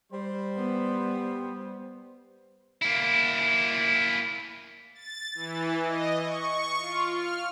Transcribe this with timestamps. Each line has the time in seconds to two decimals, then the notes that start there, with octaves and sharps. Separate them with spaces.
0.12 G3 C5
0.56 B3
2.82 A#3 E4
4.94 A6
5.35 E3
5.83 D#5
6.21 C#6
6.78 F4
7.12 F6